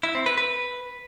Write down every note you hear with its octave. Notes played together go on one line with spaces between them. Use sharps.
E4
C4
B4
B4